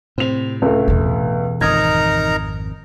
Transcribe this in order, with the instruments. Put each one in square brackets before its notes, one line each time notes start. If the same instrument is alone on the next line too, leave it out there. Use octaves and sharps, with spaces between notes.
[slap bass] A2 C3 [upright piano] C4 F7
[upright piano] C#2 A3
[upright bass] E2 B2
[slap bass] G#1 F2 [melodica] D#4 A#4 A#5 [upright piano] D#6 G#6